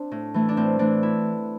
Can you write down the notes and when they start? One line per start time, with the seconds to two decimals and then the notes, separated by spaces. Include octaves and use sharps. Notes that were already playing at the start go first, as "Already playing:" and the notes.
Already playing: C4 D4
0.11 A2
0.34 E3 A3
0.49 D4
0.57 A2 C4
0.79 E3 A3 D4
1.03 E4